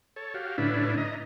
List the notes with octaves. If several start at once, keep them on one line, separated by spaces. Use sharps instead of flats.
A4 C#5
F#4 G4 F5
A2 D3 C#4 D4 E4 B4
D#5 A#5